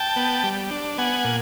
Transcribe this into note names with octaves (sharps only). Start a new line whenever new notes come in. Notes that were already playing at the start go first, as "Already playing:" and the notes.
Already playing: G5 A5
B3
G3
D4
B3 F#5 G#5
A#2